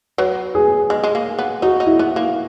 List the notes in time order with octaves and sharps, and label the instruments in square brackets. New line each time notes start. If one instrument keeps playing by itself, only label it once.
[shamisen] F#3 [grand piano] B4
[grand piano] G#4
[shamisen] G#3
G#3
A#3
B3
[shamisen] D#4 [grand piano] F#4
[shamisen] D#4
[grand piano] E4
[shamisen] B3
A#3